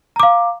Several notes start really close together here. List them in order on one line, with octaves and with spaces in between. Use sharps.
A#5 D6 F5